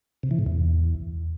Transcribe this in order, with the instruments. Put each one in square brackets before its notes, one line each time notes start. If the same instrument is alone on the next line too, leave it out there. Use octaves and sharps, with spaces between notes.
[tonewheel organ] C3
E3
G#2
E2